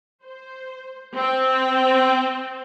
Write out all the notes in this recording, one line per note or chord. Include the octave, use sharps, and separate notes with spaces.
C5
C4